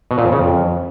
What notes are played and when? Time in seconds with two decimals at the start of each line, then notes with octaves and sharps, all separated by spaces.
0.11 B2
0.18 A#2
0.25 F2
0.32 C#3
0.39 F2